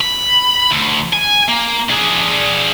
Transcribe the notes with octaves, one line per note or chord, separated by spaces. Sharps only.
B5
D2
G#5
A#3
D4 G#4